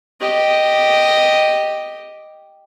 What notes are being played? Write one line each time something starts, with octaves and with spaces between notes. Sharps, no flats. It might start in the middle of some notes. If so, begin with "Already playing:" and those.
G4 D#5